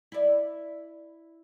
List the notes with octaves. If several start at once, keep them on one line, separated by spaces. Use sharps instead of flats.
E4 D5